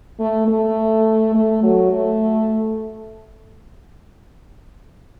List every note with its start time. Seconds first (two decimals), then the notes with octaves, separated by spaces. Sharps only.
0.20 A3
0.48 A3
1.35 A3
1.63 F#3
1.92 A3